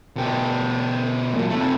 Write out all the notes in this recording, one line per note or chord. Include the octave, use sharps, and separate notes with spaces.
B2 G4
A#2 F#3
C3 A3